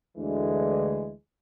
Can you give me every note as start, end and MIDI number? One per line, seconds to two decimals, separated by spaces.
0.17 1.12 38
0.17 1.12 50
0.17 1.12 52
0.17 1.12 56